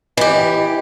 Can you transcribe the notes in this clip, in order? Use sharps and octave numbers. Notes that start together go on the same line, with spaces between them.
E3 G4 D#5